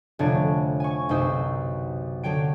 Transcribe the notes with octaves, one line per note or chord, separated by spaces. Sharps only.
F1 D3 D4 C#5
G#5 C#6
B1 F#2 C3 D#4 C5 E6
D3 F#3 C#5 G5 D7